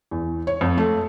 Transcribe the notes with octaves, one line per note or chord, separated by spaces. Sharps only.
E2
C#5
F2
A3